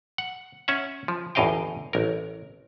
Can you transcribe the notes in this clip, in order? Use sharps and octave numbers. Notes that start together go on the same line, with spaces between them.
F#5
C#4 E5 F#5
F3
G1 E2 A2 D#5 F5 G5
A1 A#4